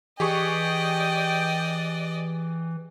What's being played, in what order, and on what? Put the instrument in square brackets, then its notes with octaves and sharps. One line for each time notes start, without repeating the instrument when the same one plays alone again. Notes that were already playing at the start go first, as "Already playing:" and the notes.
[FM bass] E3 [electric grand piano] G4 G#4 C#6 [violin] D5 D#5 [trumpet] G5